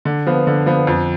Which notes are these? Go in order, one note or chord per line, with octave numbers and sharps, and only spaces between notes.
D3
F3 B3
D3
F3 B3
F2